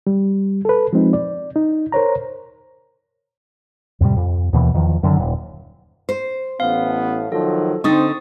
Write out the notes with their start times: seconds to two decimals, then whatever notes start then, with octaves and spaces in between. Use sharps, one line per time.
0.07 G3
0.65 A4 B4
0.93 F3 G#3 C4 D#4
1.13 D5
1.56 D#4
1.92 A#4 C5 C#5 A#5
4.00 F2 A2 C3 G3
4.16 F2
4.53 D#2 B2 E3
4.74 E2 D#3 F3
5.03 F#2 D3 D#3 F#3
5.17 D#1
6.09 C5
6.60 A1 A2 B3 F5
7.32 D#3 F3 F#3 A4
7.84 D3 C4 D#4 C#6 D#6 A6